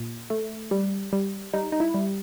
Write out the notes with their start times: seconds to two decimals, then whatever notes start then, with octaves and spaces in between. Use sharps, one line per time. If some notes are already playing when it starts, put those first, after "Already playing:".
Already playing: A#2
0.30 A3
0.71 G3
1.13 G3
1.54 G3 D#4
1.72 D#4
1.80 E4
1.94 G3